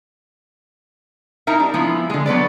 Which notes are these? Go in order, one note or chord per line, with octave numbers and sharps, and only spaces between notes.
D#4 E4 A#4 E5
G3 D4
F3 G#3 B3 E4
D3 G#3
F#3 B3 B4 D5